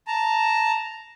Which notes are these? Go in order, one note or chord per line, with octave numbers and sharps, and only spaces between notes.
A5 A#5